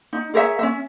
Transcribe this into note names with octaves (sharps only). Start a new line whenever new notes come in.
D#4
G#4 A#4 C#5 E5
C#4 E5